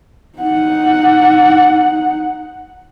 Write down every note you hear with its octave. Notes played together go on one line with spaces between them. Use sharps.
D#4 F#5